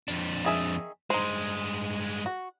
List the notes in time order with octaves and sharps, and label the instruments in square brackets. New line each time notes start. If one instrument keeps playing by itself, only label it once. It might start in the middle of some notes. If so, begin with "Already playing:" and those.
[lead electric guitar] F2 D4
[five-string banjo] D#3 G#4 E5
[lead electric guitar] G2 G#3 [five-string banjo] D#4 C5
[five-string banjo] F#4